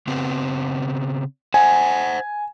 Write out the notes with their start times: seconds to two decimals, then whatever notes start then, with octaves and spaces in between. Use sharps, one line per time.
0.07 C#3 B3 C4
1.54 C5 E5 F#5 G#5